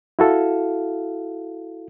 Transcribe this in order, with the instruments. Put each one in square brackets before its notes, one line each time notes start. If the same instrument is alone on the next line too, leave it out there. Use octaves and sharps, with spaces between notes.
[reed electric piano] E4 F#4 A4 F5